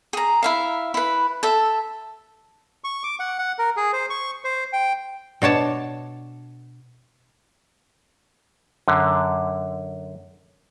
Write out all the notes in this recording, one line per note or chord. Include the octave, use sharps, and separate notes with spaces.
G#4 A#5
E4 E5 F5
E4 B4
A4 E5
C#6
D6
F#5
F#5
A#4
G#4
C5
C#6
C5
G5
B2 D4 C#5 A5
F#2 D3